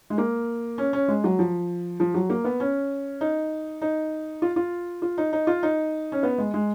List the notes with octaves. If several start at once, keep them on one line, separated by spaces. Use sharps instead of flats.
G#3
A#3
C#4
C#4
G#3
F#3
F3
F3
F#3
A#3
B3
C#4
D#4
D#4
F4
F4
F4
D#4
D#4
F4
D#4
C#4
B3
G#3
G#3